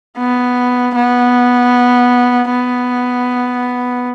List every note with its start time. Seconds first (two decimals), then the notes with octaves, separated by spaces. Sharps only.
0.18 B3
0.95 B3
2.50 B3